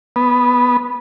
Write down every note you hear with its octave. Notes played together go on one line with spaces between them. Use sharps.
B3